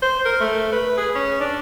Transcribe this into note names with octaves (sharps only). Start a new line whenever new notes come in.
C5
A#4
A3
B4
G#4
C#4
D4